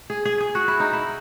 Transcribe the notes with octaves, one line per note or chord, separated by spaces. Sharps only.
G#4
G#4
G#4
F#4
E4
D#4
E4